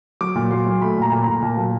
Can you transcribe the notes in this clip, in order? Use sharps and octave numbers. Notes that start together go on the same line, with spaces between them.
F#3 D6
A#2
F#3 C6
F#3
A3 B5
A#2 A#5
A#2
A#5
A#2
A#2 A5
F#3